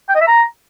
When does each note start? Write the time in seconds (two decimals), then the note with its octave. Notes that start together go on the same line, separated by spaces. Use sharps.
0.09 G5
0.15 D#5
0.21 E5
0.27 A#5